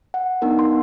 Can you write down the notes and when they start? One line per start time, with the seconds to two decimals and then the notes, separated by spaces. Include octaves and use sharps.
0.14 F#5
0.42 B3 D4 D#4 A#4
0.59 C6